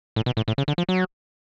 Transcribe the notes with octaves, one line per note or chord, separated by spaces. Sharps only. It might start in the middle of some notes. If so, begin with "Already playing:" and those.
A2
B2
A2
A2
C#3
D3
F3
F#3